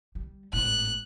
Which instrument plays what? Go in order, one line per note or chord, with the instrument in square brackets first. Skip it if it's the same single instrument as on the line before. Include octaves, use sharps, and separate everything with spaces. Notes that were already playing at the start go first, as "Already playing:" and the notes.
[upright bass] G3
[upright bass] G#1 A2 [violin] F#6